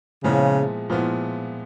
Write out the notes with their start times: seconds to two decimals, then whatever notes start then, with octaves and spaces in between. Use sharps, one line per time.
0.24 A#2 C#3 F3 G#3 B3 E4
0.89 A#2 F3 G#3 B3 E4